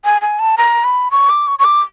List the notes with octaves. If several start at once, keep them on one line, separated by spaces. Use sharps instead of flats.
G#5
G#5
A5
A#5
B5
C#6
D6
C#6
C#6
D6